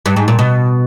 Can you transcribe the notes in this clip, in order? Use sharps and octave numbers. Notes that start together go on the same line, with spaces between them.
G2
G#2
A#2
B2